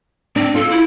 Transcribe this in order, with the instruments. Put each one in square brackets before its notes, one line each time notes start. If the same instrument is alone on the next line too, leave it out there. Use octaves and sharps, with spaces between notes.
[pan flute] C4 [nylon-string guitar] D4
[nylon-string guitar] F4 [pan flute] A4
[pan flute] E4